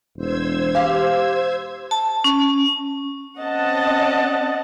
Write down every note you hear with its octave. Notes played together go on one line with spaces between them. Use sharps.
E1 C5 E6 G#6
G4 F5
A5
C#4
C4 C#4 D#5 F#5 A5